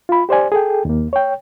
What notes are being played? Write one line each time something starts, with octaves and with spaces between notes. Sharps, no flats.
F4 B5
G4 C5 D5 G#5
G#4 A4 G5
D#2 A#3
C#5 G5